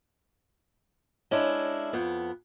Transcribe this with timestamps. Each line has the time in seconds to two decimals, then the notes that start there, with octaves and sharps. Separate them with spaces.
1.31 G#3 C#4 D4 E4
1.93 F2 B3